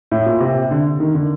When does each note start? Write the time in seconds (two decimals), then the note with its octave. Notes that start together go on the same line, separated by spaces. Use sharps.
0.11 A2
0.26 A#2
0.40 C3
0.71 D3
1.00 D#3
1.14 D3